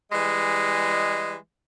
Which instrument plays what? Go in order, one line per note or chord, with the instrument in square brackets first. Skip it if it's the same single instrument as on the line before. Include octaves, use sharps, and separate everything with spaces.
[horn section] E3 G3 G#3